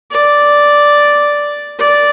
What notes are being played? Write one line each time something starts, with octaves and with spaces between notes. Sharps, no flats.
D5
D5